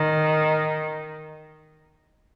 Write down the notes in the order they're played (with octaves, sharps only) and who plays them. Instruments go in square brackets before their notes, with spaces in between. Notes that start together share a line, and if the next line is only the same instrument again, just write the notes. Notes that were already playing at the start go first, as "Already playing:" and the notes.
Already playing: [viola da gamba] D#3